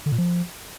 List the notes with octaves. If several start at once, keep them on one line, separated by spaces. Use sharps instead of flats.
D3
A#2
F3